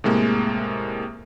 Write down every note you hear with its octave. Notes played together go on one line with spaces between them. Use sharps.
A2 C3 G#3 A#3